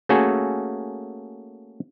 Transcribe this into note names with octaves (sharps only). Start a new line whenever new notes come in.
A3 A#3 C#4 F#4 G#4 A4